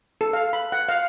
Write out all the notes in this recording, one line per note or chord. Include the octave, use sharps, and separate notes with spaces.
A4
F5
B5
F#5
F5